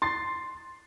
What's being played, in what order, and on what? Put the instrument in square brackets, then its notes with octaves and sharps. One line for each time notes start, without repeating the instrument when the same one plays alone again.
[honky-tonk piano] C6 A6 C7